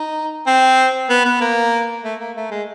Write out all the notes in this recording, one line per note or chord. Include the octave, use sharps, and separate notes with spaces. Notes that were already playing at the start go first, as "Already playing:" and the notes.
Already playing: D#4
C4
B3
B3
A#3
A3
A#3
A3
G#3